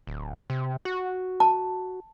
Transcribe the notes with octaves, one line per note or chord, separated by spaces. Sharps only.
D1
C3
F#4
A5